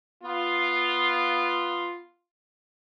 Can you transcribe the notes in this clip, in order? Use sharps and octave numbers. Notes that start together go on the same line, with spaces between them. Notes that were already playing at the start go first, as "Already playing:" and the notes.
B3 F4